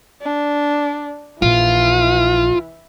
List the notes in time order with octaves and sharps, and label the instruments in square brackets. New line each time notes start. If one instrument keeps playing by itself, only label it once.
[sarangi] D4
[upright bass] A#1 [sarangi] E3 [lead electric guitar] F4